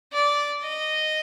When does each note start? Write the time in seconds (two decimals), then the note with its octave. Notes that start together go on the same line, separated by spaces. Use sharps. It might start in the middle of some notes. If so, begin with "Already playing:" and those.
0.13 D5
0.63 D#5